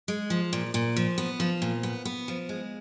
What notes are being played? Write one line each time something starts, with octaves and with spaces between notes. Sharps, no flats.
G#3
F3
A#2
A#2
F3
B3
F3
A#2
B3
B3
F3
G#3